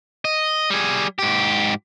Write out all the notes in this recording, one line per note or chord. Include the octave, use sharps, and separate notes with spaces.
D#5
G3 G#4
G#2 G4